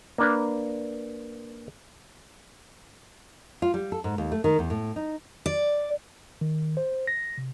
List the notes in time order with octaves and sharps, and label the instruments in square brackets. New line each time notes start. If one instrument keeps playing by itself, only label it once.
[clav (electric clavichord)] A#3 D4 B4
[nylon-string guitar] F4
G3
A4
G#2
D#2
A3
D#3
E2
A2
D#4
[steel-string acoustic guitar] D5
[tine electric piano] D#3
C5
A#6
C3